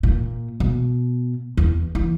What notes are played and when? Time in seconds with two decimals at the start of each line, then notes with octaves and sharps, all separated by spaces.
0.03 A#2
0.60 B2
1.57 E2
1.95 E3